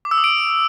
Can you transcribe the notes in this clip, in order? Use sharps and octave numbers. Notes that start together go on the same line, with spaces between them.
D6
E6
D#6
D7